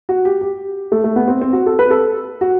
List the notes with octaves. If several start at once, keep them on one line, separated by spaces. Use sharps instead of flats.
F#4
G4
G4
A3
A3
B3
C4
C4
F#4
A4
B4
A4
F#4